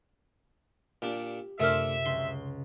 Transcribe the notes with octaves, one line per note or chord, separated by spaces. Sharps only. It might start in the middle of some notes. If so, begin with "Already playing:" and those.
A#2 D4 G4
F#2 C3 A3 D4 A#4 E5 F6
C#2 C6